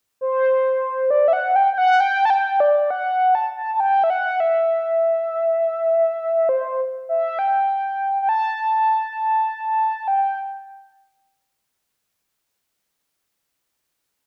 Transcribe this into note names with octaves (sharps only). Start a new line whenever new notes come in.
C5
D5
E5
F#5
G5
G5
F#5
G5
A5
G5
D5
F#5
A5
A5
A5
G5
E5
F#5
E5
C5
E5
G5
G5
A5
G5